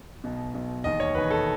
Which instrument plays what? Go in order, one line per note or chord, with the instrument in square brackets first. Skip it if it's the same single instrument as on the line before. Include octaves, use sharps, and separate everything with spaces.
[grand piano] B1 B2
B1 B2
E1 D#2 D#3 D#5
C#5
E1 D#2 D#3 B4
A4